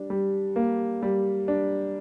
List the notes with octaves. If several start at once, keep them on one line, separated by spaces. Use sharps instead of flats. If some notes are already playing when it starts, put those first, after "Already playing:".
Already playing: G3 D4
G3
A#3
G3
D4